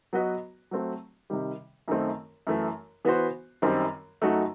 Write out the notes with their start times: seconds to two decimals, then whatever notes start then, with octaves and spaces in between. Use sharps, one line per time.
0.13 F#3 B3 F#4 B4 D#5
0.71 F#3 A3 C4
1.30 C3 D#3 G3
1.88 F#2 D#3 A3 C4
2.47 F#2 E3 A3
3.05 E3 B3 F#4 C5
3.62 F#2 D#3 G3 C4
4.22 F#2 F#3 A3 D#4 F#4